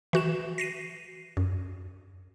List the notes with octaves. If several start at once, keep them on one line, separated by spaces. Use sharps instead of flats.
E3 F#4 E7
A#6 C7 D#7
F#2